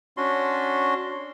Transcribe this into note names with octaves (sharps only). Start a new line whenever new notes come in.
C#4 D4 F#4 C6